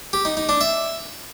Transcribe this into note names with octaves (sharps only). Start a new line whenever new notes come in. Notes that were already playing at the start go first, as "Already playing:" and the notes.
G4
D#4
D#4
D4
E5